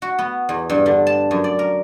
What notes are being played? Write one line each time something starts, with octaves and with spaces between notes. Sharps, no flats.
F#4
B3
E2
G2
D3
A5
F#2
D5
A#4